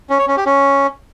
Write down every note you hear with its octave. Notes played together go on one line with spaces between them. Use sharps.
C#4
C#5
C#4
G4
C#4